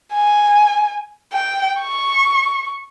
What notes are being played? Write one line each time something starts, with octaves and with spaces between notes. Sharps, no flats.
G#5
G5
C#6